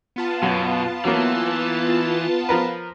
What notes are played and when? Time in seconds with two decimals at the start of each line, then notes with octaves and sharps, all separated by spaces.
0.16 B3 F4 A5
0.43 F#2 B2
1.05 E3 F#3 A#3
2.49 F3 A#4 B4